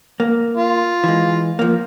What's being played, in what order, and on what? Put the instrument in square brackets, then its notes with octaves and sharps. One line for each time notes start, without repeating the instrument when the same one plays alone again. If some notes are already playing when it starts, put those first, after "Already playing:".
[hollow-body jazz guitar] A#3
[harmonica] F4
[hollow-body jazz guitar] E3 G#3
F3 A#3